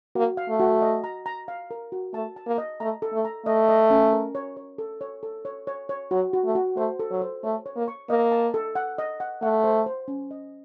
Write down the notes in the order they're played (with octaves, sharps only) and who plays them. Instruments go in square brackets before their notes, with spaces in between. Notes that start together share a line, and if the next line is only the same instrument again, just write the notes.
[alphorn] A#3 [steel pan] F#4
[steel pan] F5
[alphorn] A3
[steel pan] F#4
D#5
A#5
A#5
F5
A#4
F#4
[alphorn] A3 [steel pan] A5
[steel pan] A5
[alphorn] A#3
[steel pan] D#5
[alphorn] A3 [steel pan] A#5
[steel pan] A4
[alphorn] A3
[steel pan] A#5
[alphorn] A3 [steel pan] D#5
[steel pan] D#5
C#4
A#4
C#5
C#5
A4
C#5
A4
C#5
C#5
C#5
[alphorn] F#3 [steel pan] F#4
[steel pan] F#4
[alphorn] A3
[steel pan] F#4
[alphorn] A3 [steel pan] C5
[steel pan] A4
[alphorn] F#3
[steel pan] C5
[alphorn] A3 [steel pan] C#5
[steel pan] C#5
[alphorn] A#3
[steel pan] C#6
[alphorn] A#3 [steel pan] D#5
[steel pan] A5
A4
F#5
D#5
F#5
[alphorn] A3 [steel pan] F#5
[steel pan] C5
C5
C#4
D#5